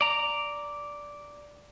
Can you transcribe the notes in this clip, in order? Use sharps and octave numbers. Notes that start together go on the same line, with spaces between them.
D5 A#5